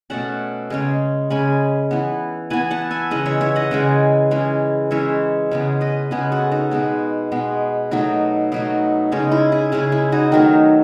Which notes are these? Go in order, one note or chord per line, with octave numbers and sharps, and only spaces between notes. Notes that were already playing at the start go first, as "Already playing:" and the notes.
B2 A3 C#4 F#5 A5
C#3 G#3 C#4
C#3 G#3 C#4 G#5 B5
E3 B3
E3 B3 G#5 B5
F#5 A5
E5 G#5
C#3 E3 G#3 D#5 F#5
C#5 E5
C#5 E5
D#5 F#5
C#3 E3 G#3
E3 G#3 C#4
E3 G#3 C#4 C#5 E5
C#3 G#3 B3
B4 D#5
C#3 G#3 B3 G#4 B4
F#4 A4
D#4 F#4
B2 G#3 B3
B2 G#3 B3
B2 F#3 A3 D#4
B2 F#3 A3 D#4
C#3 G#3 C#4 D#4
E4
E4 G#4
C#3 G#3 C#4 E4 G#4
E4
D#4 F#4
D#3 F#3 A3 D#4